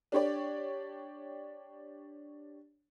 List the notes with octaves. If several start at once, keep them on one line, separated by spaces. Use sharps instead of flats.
D4 G4 C#5 D5